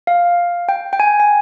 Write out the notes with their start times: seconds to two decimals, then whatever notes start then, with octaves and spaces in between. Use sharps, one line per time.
0.07 F5
0.69 G5
0.93 G5
1.00 G#5
1.20 G#5